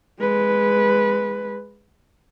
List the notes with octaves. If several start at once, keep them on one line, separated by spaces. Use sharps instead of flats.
G#3 B4